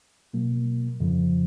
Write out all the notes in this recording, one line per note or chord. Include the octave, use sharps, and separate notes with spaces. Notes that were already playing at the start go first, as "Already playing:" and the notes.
B2 F#3 A#3
F2 C#3 F3